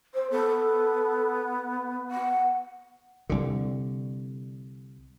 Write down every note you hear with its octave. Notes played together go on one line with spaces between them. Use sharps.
C5
B3 A4
F#5
C2 D3